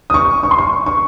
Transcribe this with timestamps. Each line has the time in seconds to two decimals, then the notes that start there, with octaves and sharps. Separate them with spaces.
0.10 D#6
0.14 C#6
0.43 C#6
0.51 C6
0.58 C#6
0.86 C#6